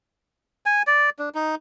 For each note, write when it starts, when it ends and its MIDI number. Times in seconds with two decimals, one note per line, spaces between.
0.66 0.82 80
0.87 1.10 74
1.19 1.29 62
1.35 1.55 63